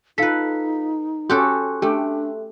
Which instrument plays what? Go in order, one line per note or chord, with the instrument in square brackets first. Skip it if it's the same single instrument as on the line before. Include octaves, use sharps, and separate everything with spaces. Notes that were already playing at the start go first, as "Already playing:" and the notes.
[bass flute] D#4 [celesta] F4 F5 B6 [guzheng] A4 B4
[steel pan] C#4 F#4 [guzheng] G4 A4 G5 [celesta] C6 F#6
[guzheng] A3 [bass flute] D4 [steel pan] G4